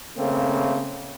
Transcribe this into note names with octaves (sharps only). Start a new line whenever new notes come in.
C#3 A3 A#3 C4